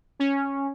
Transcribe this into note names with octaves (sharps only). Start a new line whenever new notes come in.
C#4